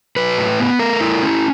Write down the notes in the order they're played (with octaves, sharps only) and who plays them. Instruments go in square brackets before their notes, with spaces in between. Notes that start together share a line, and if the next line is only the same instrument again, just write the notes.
[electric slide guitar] F#3 B4
A2
B3
A3 A#4
E4
C#4